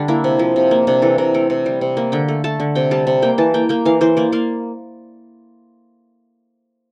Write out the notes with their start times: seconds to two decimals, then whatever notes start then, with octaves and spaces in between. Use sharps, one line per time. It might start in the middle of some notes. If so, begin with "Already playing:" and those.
Already playing: D3 G3 D4
0.08 A#3 E4
0.24 C3
0.39 F3
0.56 C3
0.71 A#3
0.87 C3 D4
1.02 E3 A4
1.18 C3 A#4
1.34 A3 A#4
1.50 C3
1.66 G3
1.81 C3
1.97 A#3
2.12 D3 G5
2.28 A3
2.44 A3 A5
2.60 D3
2.75 C3 G5
2.91 G3 A5
3.07 C3
3.22 A#3 G5
3.38 E3 A5
3.54 A#3 G5
3.69 A#3 G5
3.85 E3 F5
4.01 E3 C5
4.17 A#3 D5
4.32 A#3 F5